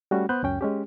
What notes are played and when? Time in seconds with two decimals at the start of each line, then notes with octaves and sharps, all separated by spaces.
0.11 G3 A3 C#4 F#4
0.29 B3 B4 C5 F#6 G6
0.43 C#2 F#2 C#4 G5
0.61 G#3 C#4 G4